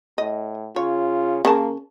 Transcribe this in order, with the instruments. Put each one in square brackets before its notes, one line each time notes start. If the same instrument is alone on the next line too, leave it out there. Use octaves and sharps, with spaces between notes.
[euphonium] A2 [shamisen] D#5
[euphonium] C#3 [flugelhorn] F4 [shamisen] C#5
[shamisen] C#3 A#4 A5 [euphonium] A#3